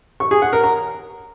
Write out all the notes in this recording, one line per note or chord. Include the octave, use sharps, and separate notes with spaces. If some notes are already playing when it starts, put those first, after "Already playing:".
C#6
G#4
F#5
A#4
A#5